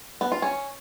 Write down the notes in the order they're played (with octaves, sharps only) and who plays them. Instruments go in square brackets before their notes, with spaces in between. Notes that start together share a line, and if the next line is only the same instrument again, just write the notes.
[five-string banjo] B3
F4
C#4